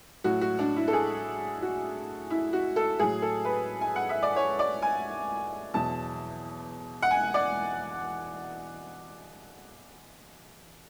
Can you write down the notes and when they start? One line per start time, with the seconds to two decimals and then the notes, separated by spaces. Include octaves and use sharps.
0.24 A2 F#3 F#4
0.41 F#4
0.59 D4
0.76 E4
0.88 A4
0.93 G#4
1.62 F#4
2.30 E4
2.53 F#4
2.76 A4
2.99 A2 F#3 G#4
3.22 A4
3.45 B4
3.81 G#5
3.96 F#5
4.09 E5
4.23 D5
4.36 C#5
4.59 D5
4.82 G#5
5.74 E2 B2 F#3 A5
7.02 F#5
7.11 G#5
7.34 D5